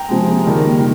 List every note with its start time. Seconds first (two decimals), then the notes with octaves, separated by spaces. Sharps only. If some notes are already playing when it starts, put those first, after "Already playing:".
Already playing: G5 A#5
0.09 C3 F3 G#3
0.44 D#3 G3 A#3
0.79 D#3